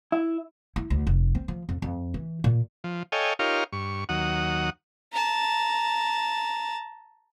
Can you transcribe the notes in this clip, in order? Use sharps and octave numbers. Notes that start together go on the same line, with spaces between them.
E4
E4
D2
F1
C4
F3
F2
F2
E3
A#2
F3
A4 C#5 D#5 F5 G5 G#5
D#4 F4 G4 A#4 C#5 F5
G2 C#6
D#2 F#3 F#5 D#6
A5 A#5